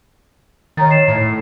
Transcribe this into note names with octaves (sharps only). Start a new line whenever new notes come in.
D#3 C#5 A#5 A6
C7 E7
A2